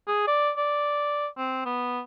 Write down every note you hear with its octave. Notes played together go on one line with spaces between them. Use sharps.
G#4
D5
D5
C4
B3